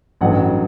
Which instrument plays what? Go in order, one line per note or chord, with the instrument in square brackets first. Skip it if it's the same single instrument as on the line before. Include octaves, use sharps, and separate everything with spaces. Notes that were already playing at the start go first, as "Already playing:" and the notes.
[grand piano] A1 G2 F#3 A3 F#5